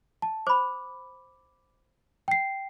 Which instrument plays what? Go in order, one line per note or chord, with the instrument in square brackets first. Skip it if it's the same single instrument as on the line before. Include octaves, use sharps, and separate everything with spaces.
[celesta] A5
[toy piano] C5 B5 [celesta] D6
[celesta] G5 C7